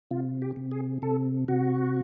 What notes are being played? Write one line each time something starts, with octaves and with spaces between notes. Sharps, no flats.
C3 F4
G4
C3
G#4
C3 A4
C3 F#4